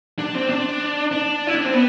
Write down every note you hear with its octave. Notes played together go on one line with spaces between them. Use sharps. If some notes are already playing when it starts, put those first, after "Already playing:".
D4
C4
D4
D4
E4
D4
C4
B3